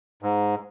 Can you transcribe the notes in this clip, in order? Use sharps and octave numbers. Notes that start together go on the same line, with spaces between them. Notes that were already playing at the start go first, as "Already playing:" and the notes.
G#2